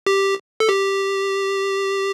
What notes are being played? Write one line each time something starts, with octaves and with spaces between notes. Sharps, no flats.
G4
A4
G4